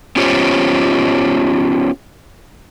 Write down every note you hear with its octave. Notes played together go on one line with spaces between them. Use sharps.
B3 C#4 F4 G4 C5 C#5